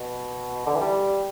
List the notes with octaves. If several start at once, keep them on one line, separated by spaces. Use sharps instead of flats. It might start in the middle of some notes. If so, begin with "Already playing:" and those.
Already playing: B2
D3
E3
G3